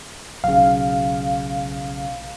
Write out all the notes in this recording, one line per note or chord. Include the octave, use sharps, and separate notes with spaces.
B1 C#3 F5